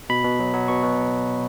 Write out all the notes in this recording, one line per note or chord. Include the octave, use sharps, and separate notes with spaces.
B2 B5
B2
F#3
F#3
B2 C#6
B2